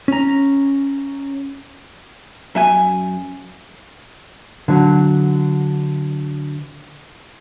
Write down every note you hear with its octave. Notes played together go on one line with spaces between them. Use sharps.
C#4 A#5
F#2 E5 G#5
D3 F#3